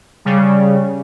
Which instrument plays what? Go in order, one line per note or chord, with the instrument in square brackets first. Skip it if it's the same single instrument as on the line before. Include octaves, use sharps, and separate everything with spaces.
[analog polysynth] C#3 G3